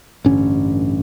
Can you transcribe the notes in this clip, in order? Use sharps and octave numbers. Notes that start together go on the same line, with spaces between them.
A1 G2 D3 C#4